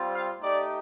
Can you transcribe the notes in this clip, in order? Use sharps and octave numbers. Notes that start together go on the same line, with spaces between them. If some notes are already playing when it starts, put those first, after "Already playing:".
Already playing: G3 C4 F4
F5
A3 D#4 G4 D5